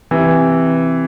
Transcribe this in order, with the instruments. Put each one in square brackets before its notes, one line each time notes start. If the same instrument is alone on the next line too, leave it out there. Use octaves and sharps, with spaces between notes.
[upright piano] C3 E3